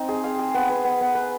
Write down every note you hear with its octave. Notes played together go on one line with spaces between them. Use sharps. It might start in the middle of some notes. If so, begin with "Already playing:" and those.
Already playing: C4 D#4
G#4
F5
G#4
B3
B3
B3
B3
B4